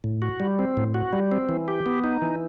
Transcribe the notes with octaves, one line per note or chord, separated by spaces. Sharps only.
A2
F#4
G3
C4
A2
F#4
G3
C4
E3
G4
B3
D#4
E3